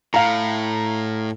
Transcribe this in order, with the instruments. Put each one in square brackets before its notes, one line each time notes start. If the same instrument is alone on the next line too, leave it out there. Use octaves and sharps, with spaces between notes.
[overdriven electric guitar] A2 [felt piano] F5 A#5